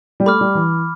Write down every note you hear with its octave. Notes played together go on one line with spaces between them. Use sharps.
G3
A3 B5 D6 F6
G3
E3